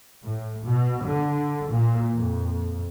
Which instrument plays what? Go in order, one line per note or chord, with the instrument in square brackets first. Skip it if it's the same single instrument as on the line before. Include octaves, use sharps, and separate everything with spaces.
[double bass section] A2
B2
D3
A#2
F2